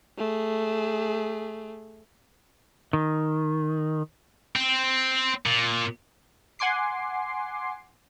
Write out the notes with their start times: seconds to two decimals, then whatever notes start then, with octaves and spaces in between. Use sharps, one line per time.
0.18 A3 G#4
2.93 D#3
4.55 C4
5.46 A#2
6.59 F#5 G#5 C6 D6 C7